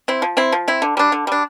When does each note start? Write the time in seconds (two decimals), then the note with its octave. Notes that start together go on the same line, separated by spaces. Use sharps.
0.08 C4 E4
0.22 F3
0.37 C4 E4
0.52 F3
0.68 C4 E4
0.82 D3
0.97 G3 D4
1.12 D3
1.27 G3 D4